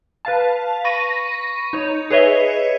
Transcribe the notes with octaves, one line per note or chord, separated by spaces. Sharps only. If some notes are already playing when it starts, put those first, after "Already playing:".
B4 F5 A5
B5 C#6 A#6 D#7
D#4 C#5
G#4 B4 C#5 D#5 E5